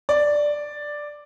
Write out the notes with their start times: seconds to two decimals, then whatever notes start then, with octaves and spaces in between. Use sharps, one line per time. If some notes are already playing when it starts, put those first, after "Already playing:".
0.09 D5